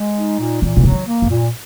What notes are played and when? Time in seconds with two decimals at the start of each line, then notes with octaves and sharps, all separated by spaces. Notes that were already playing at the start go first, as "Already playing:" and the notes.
Already playing: G#3
0.17 D#4
0.39 A#2
0.62 A#2 E3
0.77 B2
0.84 C#3 F#3
0.92 D#3
1.07 A#3
1.22 F#2
1.29 A#2